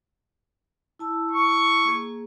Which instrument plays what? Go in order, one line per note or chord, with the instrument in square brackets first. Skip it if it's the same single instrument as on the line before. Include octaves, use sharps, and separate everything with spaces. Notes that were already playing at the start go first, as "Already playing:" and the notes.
[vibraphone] E4 A5 E6
[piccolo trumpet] C#6
[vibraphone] A#3 G#4